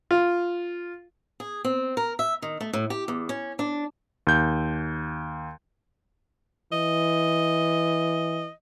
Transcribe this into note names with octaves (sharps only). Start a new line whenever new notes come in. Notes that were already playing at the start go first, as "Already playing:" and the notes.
F4
G#4
C4
A#4
E5
D#3
A3
A2
G4
E2
C#4
D4
D#2 G6
E3 D#5